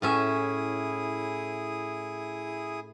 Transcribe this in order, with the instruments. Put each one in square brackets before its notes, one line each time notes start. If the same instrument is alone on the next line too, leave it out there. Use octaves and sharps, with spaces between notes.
[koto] A2 C#4 E5 [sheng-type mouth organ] E4 G#4 D#6